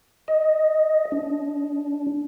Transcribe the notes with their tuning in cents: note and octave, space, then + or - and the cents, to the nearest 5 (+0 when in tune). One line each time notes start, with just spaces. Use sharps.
D#5 +5
D4 -30